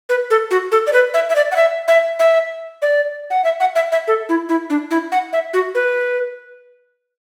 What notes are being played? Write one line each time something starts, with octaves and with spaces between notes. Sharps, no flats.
B4
A4
F#4
A4
D5
B4
E5
E5
D5
F#5
E5
E5
E5
D5
F#5
E5
F#5
E5
E5
A4
E4
E4
D4
E4
F#5
E5
F#4
B4